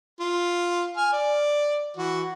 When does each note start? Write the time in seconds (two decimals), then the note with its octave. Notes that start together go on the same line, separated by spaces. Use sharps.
0.20 F4
0.97 G#5 F6
1.13 D5
1.97 E3 F#4